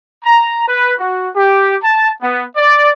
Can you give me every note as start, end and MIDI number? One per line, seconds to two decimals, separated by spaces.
0.24 0.64 82
0.67 0.92 71
0.98 1.28 66
1.34 1.75 67
1.82 2.09 81
2.22 2.43 59
2.56 2.88 74